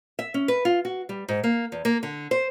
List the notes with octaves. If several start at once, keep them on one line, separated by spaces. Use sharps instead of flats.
E5
C#4
B4
F4
F#4
G3
G#2
A#3
E2
A#3
D3
C5